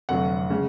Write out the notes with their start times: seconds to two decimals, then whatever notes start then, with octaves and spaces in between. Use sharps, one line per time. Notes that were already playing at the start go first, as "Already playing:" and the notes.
0.09 F1 F2 D3 F#3 F#5
0.50 C#3 G#3